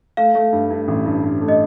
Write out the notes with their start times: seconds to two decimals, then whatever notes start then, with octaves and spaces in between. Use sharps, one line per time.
0.17 A3 F5
0.35 A3
0.52 G2
0.70 G2
0.88 A1
1.06 G2
1.23 G2
1.41 A3
1.48 D#5